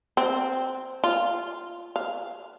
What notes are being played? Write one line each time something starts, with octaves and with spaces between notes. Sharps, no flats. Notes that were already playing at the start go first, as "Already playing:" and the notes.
C4
F4
F5